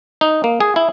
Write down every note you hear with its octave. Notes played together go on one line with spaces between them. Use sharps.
D#4
A#3
G#4
E4